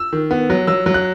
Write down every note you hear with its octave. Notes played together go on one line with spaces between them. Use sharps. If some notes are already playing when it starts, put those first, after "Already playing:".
Already playing: E6
D#3
B3
F#3
F#3 E6
F#3
F#6